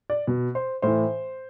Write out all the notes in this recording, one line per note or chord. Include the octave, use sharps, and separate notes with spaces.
D5
B2
C5
A2 E3 C5